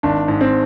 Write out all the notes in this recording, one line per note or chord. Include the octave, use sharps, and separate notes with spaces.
G#1 D4
G#2
C4